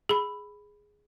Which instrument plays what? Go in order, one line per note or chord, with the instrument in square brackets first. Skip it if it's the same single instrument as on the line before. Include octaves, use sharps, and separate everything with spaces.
[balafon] G#4 B5